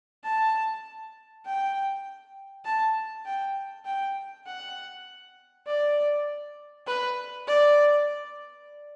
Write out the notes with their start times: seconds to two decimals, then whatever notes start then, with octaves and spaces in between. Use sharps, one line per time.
0.24 A5
1.45 G5
2.65 A5
3.25 G5
3.86 G5
4.47 F#5
5.67 D5
6.87 B4
7.47 D5